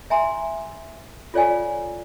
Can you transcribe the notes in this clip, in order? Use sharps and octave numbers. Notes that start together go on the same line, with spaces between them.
E5 G#5 A#5 C6
F4 A4 C#5 D5 F5 G#5